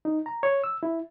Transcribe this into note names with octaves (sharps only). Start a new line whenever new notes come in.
D#4
A#5
C#5
E6
E4